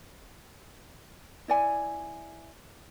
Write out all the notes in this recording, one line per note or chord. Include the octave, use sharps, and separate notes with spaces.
E4 D5 G#5